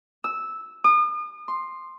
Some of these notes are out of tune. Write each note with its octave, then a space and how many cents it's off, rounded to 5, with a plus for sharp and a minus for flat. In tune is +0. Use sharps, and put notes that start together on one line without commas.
E6 -10
D#6 -40
C6 +5